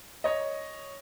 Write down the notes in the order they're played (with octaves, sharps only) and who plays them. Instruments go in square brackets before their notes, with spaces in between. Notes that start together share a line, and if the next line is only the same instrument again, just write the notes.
[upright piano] C#5 D#5